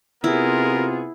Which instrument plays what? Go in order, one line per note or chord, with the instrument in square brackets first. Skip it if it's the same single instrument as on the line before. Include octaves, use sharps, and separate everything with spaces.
[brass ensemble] C3 F4 [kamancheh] B3 G#4 [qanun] E4 [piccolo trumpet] A#4